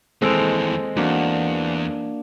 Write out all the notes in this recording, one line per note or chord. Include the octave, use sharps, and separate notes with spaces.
D#2 E3 G#3 C4 A4 D#5 E6 D7
E2 A#3 D4 F#4